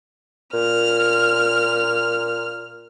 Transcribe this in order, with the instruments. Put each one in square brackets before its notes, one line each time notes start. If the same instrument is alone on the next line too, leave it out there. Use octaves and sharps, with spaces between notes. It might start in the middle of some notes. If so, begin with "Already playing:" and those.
[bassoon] A#2 [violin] F6